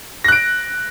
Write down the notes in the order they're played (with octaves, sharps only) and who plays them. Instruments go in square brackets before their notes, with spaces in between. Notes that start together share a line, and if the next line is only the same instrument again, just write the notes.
[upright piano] A#6
F#6
D7